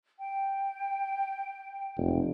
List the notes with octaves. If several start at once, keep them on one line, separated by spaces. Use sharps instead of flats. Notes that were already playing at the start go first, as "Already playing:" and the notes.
G5
F1